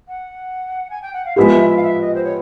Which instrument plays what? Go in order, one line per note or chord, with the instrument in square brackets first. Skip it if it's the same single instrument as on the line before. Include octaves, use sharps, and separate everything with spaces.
[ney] F#5
G#5
G5
F#5
F5
[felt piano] F3 G#3 B3 E4 G4 [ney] E5
[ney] E5
F5
E5
D#5
C5
C#5